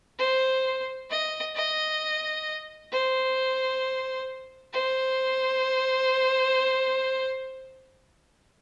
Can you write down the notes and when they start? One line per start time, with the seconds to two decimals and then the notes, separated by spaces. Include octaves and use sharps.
0.19 C5
1.10 D#5
1.55 D#5
2.92 C5
4.73 C5